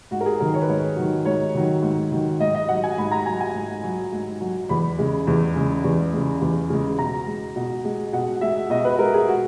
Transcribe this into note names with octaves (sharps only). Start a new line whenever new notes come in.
G#2 F#4
A#4
G#4
D#3 F#3 A#4
C#5
B4
G#2 C#5
D#3 F#3
G#2 C#5
D#3 F#3
G#2
D#3 F#3
G#2 D#5
D#5
F#3 F#5
G#5
G#2 B5
A#5
F#3 G#5
G#5
G#2
F#3
G#2
F#3
E2 B5
C#3 G#3
E2
C#3 G#3
E2
C#3 G#3
E2
C#3 G#3
B2 A#5
G#3
B2
G#3
B2 F#5
G#3 E5
B2 D#5
B4
G#3 A#4
G#4
F#4